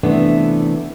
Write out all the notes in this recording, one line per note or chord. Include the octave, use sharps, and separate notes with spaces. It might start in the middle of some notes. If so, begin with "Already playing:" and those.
C3 E3 A3 B3 D4